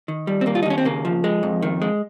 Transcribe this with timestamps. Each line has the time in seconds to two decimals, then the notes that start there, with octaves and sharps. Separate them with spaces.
0.08 D#3
0.27 G3
0.41 C4
0.46 D#2 A#3
0.55 F4
0.63 D#4
0.66 D#2 C#4
0.78 C4
0.85 C#3 A#3
1.05 F3
1.24 G#3
1.43 F2
1.62 D#3
1.82 G#3